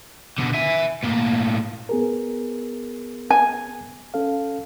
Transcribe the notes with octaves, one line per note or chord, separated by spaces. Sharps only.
B2 D3
E5 G#5
A2 A#3
B3 G#4 A#4
G#5
C#4 A4 F5